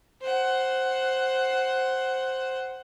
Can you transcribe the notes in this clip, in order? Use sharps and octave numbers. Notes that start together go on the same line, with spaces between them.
C5 F#5